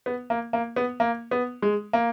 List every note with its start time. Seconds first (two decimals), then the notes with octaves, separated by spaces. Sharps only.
0.06 B3
0.30 A#3
0.53 A#3
0.76 B3
1.00 A#3
1.31 B3
1.62 G#3
1.93 A#3